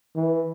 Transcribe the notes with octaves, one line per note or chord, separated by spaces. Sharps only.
E3